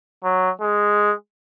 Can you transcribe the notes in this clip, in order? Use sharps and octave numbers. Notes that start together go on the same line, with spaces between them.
F#3
G#3